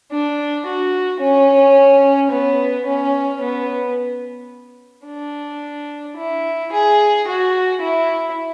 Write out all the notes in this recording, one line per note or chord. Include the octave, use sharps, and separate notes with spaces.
D4
F#4
C#4
B3
C#4
B3
D4
E4
G#4
F#4
E4